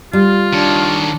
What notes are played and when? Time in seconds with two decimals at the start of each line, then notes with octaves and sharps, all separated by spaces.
0.13 G3 F4
0.53 D#3 D4 C#5